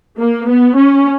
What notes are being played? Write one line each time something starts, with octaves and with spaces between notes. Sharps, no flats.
A#3
B3
C#4